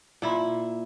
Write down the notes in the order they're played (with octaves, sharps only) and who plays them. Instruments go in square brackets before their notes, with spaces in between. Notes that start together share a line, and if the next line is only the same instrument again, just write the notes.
[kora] A#2 E4